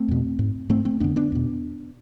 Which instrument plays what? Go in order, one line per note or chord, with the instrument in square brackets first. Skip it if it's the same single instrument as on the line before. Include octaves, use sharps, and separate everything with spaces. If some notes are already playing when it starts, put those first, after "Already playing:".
Already playing: [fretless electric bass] A3 C4
E2 B2
G#2
G#2 A3 C4
A3 C4
F2 D3 B3 D4
B3 D4
E2 B2